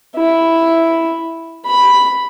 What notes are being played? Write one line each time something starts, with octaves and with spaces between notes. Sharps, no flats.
E4
B5